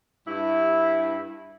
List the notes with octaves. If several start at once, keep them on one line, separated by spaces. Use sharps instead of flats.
G2 E4